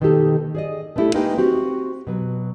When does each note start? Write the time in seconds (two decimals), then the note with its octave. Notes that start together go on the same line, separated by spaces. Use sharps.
0.01 B2 D#3 A#3 D#4 G4 A4
0.55 G#4 D5 D#5
0.96 A3 B3 D4 E4 G4 A4
1.14 G#3 A#3 D#4 G4 B4 G5
1.38 C4 F#4 G4
2.07 B2 F#3